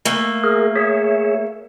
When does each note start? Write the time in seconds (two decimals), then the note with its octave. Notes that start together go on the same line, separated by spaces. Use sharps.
0.05 A3 A#3
0.44 G#4 A#4
0.76 G#4 C#5 E5